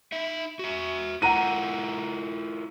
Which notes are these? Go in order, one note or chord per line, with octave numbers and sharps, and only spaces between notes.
D#4 E5
F#4 E5
E4 F4 A#4 F#5 A#5 D#7